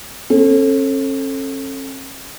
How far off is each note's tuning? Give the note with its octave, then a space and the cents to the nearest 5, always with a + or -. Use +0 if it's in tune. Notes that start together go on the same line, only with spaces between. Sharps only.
C#4 -45 A4 +0